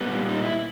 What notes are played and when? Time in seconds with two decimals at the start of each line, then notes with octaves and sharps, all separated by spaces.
0.01 A#2 G3 B3
0.29 D#4
0.43 E4